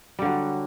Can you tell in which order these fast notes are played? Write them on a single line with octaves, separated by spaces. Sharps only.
G3 D3 F#3